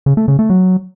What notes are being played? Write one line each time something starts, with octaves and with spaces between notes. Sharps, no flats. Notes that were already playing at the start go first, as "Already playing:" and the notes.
C#3
A3
C#3
A3
F#3